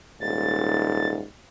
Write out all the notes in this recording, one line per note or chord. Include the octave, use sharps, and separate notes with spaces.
D#1 G#2 A6